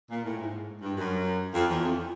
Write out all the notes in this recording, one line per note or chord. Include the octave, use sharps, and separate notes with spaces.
A#2
A2
G#2
G2
F#2
F2
E2
F2